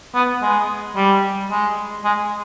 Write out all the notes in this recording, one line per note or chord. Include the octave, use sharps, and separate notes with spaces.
B3
G#3
G3
G#3
G#3